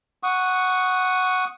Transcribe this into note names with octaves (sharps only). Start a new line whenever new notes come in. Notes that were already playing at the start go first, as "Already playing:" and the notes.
F#5 C#6 D#6